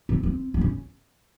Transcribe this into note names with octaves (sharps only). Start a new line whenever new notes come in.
C4
C4
C4
C#4